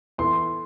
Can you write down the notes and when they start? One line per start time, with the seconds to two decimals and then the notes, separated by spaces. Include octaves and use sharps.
0.18 E3 B3 E4 A4 C6